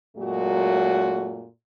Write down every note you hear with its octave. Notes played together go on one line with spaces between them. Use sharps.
F#2 A#2 F#3 G#3 A3 F#4